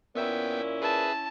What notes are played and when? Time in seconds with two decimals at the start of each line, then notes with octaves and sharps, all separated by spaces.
0.15 A#2 B3 C#4 E4 E5 G5
0.82 G#4 B4 E5 A5